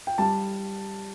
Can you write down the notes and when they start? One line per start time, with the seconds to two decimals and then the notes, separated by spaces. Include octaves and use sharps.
0.07 G5
0.18 G3 A5